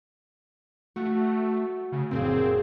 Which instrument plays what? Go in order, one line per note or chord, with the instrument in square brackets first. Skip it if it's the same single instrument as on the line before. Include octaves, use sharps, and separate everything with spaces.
[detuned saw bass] A3 [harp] F#4
[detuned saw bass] C#3
[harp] F#1 A#2 G#4 [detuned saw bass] C4